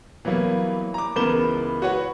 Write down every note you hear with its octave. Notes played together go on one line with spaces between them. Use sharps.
E3 F#3 G3 A#3 B3
A#5 D6
C#2 E3 B3 A#4 E7 G7
F#4 B4 C#5 F#5